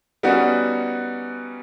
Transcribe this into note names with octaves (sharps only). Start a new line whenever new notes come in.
G3 B3 C#4 D#4 F#4